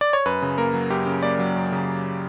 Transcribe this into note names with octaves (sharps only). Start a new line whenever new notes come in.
D5
C#5
F#2 B4
C#3
A#3 A#4
F#3
F#2 G4
C#3
A#3 D5
F#3
F#2
C#3